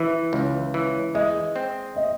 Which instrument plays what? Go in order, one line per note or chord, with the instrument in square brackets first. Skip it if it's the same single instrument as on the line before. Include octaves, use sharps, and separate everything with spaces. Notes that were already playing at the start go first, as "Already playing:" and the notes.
Already playing: [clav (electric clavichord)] E3 [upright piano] E5
[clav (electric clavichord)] C#2
E3
[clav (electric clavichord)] G#3 [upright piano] D#5
[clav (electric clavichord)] C4
[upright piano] D#5